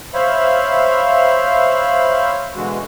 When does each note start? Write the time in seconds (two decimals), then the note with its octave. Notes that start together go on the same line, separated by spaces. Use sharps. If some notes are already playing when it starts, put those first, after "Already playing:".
0.14 C5 C#5 E5 F5 B5
2.56 B2 D3 E3 G#3 F#4